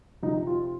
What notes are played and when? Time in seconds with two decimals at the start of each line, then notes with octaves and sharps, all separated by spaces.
0.23 F2 C3 F3 D#4
0.47 F4